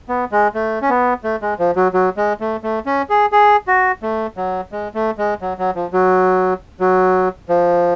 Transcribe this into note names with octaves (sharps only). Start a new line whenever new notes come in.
B3
G#3
A3
C#4
B3
A3
G#3
F3
F#3
F#3
G#3
A3
A3
C#4
G#4
G#4
F#4
A3
F#3
G#3
A3
G#3
F#3
F#3
F3
F#3
F#3
F3